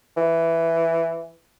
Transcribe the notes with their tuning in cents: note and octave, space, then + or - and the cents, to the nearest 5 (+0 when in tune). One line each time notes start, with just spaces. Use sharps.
E3 +5